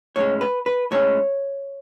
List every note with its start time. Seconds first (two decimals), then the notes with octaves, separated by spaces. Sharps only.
0.16 A2 G#3 C#4 C#5
0.41 B4
0.66 B4
0.91 A2 G#3 C#4 C#5